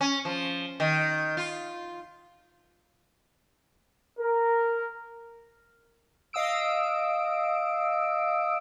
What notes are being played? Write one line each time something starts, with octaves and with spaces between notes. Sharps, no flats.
C#4
F3
D#3
F4
A#4
D#5 F5 D#6 E6 D7